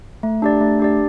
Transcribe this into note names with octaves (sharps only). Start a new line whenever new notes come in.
A3
D4 G4 D5
A3
D4 G4 D5